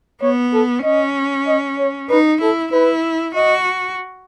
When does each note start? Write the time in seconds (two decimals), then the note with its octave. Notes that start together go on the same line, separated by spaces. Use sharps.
0.21 B3 C#5
0.53 A4
0.84 C#4 D#5
1.47 D#5
1.78 C#5
2.09 D#4 B4
2.41 E4 A4
2.72 E4 B4
3.35 F#4 D#5